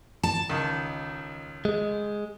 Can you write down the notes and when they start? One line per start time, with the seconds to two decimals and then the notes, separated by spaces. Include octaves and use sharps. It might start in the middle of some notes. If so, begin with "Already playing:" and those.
0.23 A5
0.50 C#2 D#3
1.65 G#3